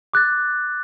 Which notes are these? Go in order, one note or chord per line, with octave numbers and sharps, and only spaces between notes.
D6 F#6 A6